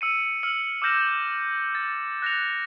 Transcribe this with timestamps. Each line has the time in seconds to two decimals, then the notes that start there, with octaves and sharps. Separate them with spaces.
0.01 E6 C#7 D#7
0.43 E6 F6 C#7 F#7
0.82 D6 E6 F6 G6 A#6 E7
1.75 A6
2.22 F#6 A#6 C#7 F7